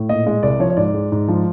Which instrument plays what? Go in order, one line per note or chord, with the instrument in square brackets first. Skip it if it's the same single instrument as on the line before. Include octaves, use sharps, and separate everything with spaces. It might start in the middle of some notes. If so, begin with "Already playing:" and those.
Already playing: [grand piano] A2
A#2 D#5
G#3 D#5
C2 D5
F3 C#5
C#5
G#2 D5
G#3
G#2
F3